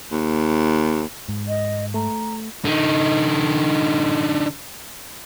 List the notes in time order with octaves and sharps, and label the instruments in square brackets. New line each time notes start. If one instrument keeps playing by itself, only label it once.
[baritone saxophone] D#2
[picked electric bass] G#2
[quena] D#5
[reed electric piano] A3 [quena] A#5
[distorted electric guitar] D3 D#4